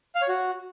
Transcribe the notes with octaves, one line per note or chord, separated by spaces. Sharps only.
F5
C#5
F#4